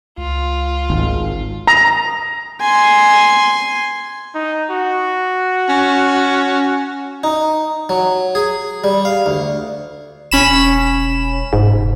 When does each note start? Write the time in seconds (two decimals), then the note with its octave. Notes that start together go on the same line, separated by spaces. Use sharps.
0.18 C#2 F4
0.90 G#1
1.67 A#5
2.61 G#5 C6
4.35 D#4
4.71 F#4
5.69 C#4
7.24 D#4
7.89 F#3
8.35 G#4
8.84 G3
9.05 F5
9.26 D2
10.31 E1 C#4 B5 E7
11.53 F1 G#2